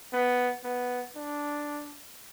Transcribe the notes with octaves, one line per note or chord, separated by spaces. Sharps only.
B3
B3
D4